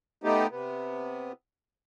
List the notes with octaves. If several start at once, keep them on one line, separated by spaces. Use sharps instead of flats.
A3 B3 D#4 G4
C3 B3